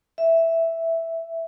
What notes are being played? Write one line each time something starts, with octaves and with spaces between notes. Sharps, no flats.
E5